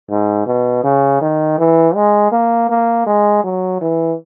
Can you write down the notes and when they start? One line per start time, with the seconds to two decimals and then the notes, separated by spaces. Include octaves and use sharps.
0.10 G#2
0.46 B2
0.84 C#3
1.21 D#3
1.58 E3
1.95 G#3
2.32 A#3
2.69 A#3
3.06 G#3
3.44 F#3
3.81 E3